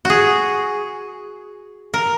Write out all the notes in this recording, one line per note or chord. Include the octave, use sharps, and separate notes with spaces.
F#4 G#4
A#4